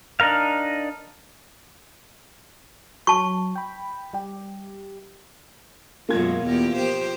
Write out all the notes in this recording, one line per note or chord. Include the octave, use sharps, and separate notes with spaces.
D4 D#4 A#4 F5
F#3 A5 C#6
G5 B5
G3 G4
F#2 B2 G#3 A#3 F4 G#6
E2 G4
F3 G4 C5